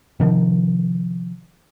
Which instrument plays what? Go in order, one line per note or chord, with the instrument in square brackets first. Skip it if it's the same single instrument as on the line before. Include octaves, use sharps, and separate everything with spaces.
[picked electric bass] C3 D#3 F3